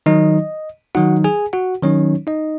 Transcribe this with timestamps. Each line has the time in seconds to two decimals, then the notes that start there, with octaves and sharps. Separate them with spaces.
0.06 D#3 F#3 D#4 D#5
0.95 D#3 F#3 D#4 F#4 F#5
1.24 G#4 G#5
1.53 F#4 F#5
1.82 D#3 F#3 C#4 D#4 C#5
2.27 D#4 D#5